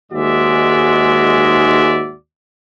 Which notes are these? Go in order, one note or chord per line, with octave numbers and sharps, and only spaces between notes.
D#2 G#2 G#3 F#4 D5 E5